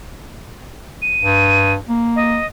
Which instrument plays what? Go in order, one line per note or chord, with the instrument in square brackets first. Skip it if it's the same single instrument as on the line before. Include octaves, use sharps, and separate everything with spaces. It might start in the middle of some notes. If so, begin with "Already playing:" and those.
[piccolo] D#7
[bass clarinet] G2
A#3
[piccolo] D#5